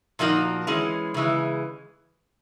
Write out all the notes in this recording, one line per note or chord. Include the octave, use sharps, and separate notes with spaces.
A#2 F3 A#3 D#4 F#4
E3 G#3 C#4
C#3 E3 G#3